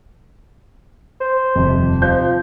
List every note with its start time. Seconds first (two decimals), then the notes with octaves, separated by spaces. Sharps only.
1.21 C5
1.56 D#1 F2 C3
2.02 F3 G6